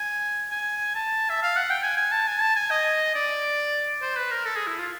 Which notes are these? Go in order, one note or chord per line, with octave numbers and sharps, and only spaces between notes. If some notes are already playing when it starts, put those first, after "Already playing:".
Already playing: G#5
G#5
A5
E5
F5
F#5
G5
G#5
G#5
A5
G#5
A5
G#5
D#5
D5
C5
B4
A#4
A4
G#4
E4
F4